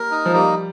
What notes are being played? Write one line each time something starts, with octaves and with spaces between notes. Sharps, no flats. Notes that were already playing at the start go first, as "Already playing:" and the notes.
Already playing: G3 A#3 A#4
D#4
F3
G3 A#3